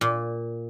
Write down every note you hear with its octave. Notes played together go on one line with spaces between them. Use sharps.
A#2